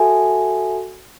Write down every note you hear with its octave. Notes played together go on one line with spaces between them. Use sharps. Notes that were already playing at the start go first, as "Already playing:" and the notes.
Already playing: F#4 A4 E5 G#5